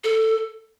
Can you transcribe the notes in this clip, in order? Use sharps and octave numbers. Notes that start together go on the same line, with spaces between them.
A4